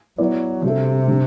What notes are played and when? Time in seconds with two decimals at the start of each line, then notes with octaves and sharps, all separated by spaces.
0.18 F#3 B3 E4 B4 D5
0.64 C3 G3 D4 F#4 A4 E5
1.08 D3 G3 D4